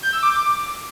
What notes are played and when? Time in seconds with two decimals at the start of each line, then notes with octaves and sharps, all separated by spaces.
0.03 G6
0.13 E6
0.23 D6